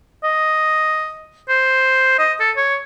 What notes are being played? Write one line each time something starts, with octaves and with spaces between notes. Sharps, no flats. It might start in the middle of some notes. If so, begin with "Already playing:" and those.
D#5
C5
D#5
A4
C#5